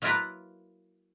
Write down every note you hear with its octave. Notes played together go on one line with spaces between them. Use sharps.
F#3 A#3 E4 F4 A#4 B4